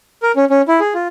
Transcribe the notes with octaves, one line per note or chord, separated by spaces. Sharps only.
A#4
C#4
C#4
E4
G#4
F4